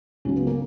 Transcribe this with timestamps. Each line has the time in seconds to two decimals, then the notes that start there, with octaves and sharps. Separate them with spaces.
0.25 C#2 C#3 F#3 C#4
0.36 B3
0.47 A#3